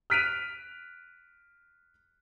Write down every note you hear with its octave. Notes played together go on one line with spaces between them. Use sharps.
F6 F#6 B6 D7 D#7 F7